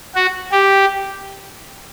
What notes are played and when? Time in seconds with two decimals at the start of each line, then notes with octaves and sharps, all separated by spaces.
0.15 F#4
0.52 G4